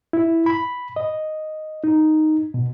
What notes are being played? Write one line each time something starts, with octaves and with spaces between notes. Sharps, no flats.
E4
B5
D#5
D#4
B2